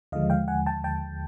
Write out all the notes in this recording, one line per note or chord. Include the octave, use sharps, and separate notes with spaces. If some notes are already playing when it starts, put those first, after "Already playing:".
D#2 D3 F3 G#3 D#5 F5
F5 G5
F#5 G#5
G5 A5
G5 A5